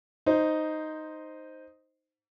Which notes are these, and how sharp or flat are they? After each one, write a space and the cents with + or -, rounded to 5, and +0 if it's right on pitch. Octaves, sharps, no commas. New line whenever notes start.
D#4 +0 C5 +0